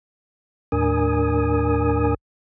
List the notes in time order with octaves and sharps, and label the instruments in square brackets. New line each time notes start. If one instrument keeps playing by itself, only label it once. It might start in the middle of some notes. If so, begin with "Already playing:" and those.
[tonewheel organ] D#2 A2 D4 A#4 G#5 D#6